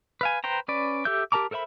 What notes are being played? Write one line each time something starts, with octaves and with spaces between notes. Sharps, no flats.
B4 F5 G#5
B4 C5 G5 A#5
C#4 B4 D5
G4 A4 E5 G6
G4 A#4 A5 A#5 D6
A4 A#4 C5 E5 B5